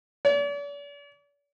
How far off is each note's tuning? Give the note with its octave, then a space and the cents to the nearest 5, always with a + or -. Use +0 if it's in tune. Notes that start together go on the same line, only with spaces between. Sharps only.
D5 -45